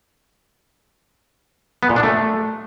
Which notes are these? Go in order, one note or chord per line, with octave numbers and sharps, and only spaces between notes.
B3
A#2
D4
A3